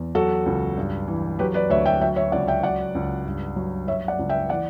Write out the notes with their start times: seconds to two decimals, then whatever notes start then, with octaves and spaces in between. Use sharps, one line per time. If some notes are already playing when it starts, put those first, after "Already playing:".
Already playing: E2
0.15 F#3 F#4 A4
0.46 C#2
0.77 G2
1.08 E3
1.39 F#3 G4 B4
1.54 B4 D5
1.70 D2 C#5 E5
1.86 E5 G5
2.01 F#3 E5 G5
2.16 C#5 E5
2.32 C#2 D5 F#5
2.48 E5 G5
2.63 F#3 D5 F#5
2.95 C#2
3.25 G2
3.56 F#3
3.87 F#3 C#5 E5
4.08 D5 F#5
4.19 C#2
4.29 E5 G5
4.49 E3 D5 F#5